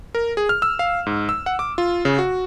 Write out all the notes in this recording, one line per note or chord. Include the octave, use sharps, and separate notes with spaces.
A#4
G#4
F6
E6
F5
G#2
E6
F#5
D6
F4
C#3
F#4